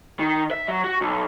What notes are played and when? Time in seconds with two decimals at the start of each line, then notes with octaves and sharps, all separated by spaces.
0.19 D#3
0.51 E5
0.68 F#3
0.84 F#4
1.01 B1